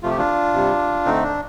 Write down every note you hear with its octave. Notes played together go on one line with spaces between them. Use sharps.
C3 F3 A3 F4
G4
D4 F4
C3 G3
D3 A3 C4 D#4
D4